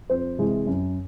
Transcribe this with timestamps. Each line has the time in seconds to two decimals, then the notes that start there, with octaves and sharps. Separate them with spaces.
0.10 F2 C5
0.39 C3 E3 G#3
0.67 F#2